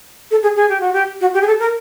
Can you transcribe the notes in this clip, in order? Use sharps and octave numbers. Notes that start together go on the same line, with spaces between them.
A4
G#4
G#4
G4
F#4
G4
F#4
G4
G#4
A4
A#4